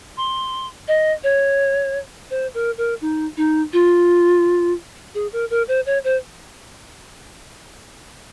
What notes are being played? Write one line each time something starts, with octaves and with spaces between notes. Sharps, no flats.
C6
D#5
C#5
C5
A#4
A#4
D#4
D#4
F4
G#4
A#4
A#4
C5
C#5
C5